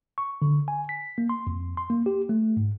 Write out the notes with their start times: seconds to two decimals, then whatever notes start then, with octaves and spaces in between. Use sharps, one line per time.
0.18 C#6
0.42 D3
0.68 G#5
0.89 B6
1.18 A#3
1.29 C6
1.47 F2
1.77 C6
1.90 A#3
2.06 G4
2.29 A3
2.57 G#2